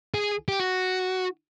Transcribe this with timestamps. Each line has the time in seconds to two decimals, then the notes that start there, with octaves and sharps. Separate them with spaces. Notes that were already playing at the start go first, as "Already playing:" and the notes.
0.14 G#4
0.48 G4
0.59 F#4